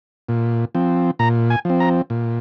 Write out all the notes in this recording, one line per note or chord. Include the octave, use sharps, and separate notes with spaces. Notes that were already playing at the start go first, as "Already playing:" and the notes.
A#2
F3 C4
A#2 A#5
G#5
F3 C4
A#5
A#2